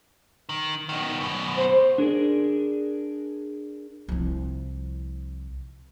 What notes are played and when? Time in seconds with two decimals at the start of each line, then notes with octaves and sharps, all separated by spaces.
0.49 D#3
0.89 B2 D#3
1.20 F#2 B2
1.58 C5
1.98 D4 G#4 A#4 D5
4.08 C2 F3